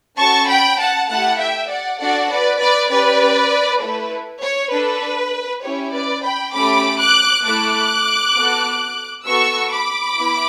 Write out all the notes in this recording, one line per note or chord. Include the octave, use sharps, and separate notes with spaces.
C#4 F#4 A4 A5 C#6
G5 B5
F#5 A5
A3 E4 G4 F#5 A5
E5 G5
D5 F#5
D4 F#4 A4 D5 F#5
B4 D5
B4 D5
C#4 G4 B4 D5
A3 E4 A4 B4
C#5
D4 A4 B4
C#4 E4 G4 C#5
B4 D5
G5 B5
A3 C#4 G4 B5 D6
D6 F#6
A3 E4 A4 D6 F#6
B3 F#4 A4
B3 F#4 A4 C#6 E6
B5 D6
B3 E4